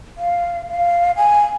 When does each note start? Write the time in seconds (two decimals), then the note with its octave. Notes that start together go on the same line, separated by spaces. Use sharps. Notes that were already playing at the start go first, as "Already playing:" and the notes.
0.18 F5
0.70 F5
1.17 G#5